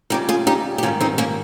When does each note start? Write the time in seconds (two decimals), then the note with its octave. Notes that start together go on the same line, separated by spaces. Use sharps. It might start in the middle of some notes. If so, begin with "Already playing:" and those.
0.10 F2 C#3 G3 D#4 G4
0.29 F4 G#4
0.47 D#4 G4
0.78 G4
0.83 G#2 D#3 G3 C#4 F4
1.00 C4 D#4
1.18 A#3 C#4